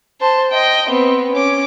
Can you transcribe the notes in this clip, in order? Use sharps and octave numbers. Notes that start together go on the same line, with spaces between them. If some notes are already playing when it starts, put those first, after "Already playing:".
C5 A5
D#5 G5
B3 C4
C#4 D6